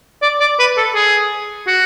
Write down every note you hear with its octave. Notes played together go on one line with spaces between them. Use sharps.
D5
D5
B4
A4
G#4
F#4